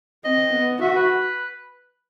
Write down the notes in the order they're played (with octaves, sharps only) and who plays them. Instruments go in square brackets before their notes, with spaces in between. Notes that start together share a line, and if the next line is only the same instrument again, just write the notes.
[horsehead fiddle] C4 [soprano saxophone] D#5
[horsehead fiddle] B3
[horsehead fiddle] F#4 [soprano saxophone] E5
[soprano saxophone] B4